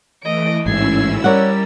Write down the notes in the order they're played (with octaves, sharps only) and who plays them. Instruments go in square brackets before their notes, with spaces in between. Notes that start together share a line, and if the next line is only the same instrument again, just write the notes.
[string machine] E3 A3 [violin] D#5 D7
[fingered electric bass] A1 G#2 [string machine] C#4 E4 E6 [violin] G#6 C7
[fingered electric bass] G3 [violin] A#4 [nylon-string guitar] C#5 D5 F#5